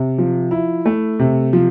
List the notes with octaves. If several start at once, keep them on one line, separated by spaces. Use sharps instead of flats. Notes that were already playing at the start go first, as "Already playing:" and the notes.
Already playing: C3
F3
E4
A3
C3
F3